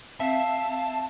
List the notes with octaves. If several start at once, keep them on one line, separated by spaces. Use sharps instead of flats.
C4 E5 F5 A5